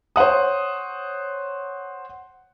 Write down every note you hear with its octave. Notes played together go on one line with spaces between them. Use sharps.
C5 C#5 F#5 D#6